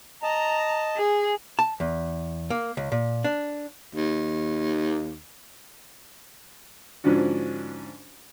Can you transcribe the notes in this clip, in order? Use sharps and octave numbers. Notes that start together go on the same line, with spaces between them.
D#5 A5 A#5
G#4
A5
E2
A#3
C#2
A#2
D4
D#2
G#2 D3 F3 C#4 D4 F#4